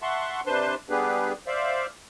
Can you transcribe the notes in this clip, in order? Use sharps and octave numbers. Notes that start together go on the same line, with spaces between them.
E5 F#5 A5 C6 C#6
C3 D4 B4 C5 A5 C6
G3 B3 D4 G4 G#4 B4
C5 D5 E5 F5